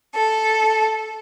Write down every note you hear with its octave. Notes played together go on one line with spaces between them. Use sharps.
A4